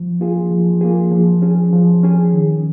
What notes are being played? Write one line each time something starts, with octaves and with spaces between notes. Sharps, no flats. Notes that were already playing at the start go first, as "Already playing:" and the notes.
Already playing: F3
A#3 F4 G#4
F3
A#3 F4 G#4
F3
C#4 G#4
F3
C#4 G#4
D#3